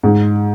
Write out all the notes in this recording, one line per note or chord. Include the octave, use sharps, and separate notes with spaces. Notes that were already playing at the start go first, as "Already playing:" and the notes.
G#2